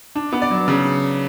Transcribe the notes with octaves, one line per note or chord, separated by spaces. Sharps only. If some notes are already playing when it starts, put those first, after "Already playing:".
D4
B3
D5
F#3
C#3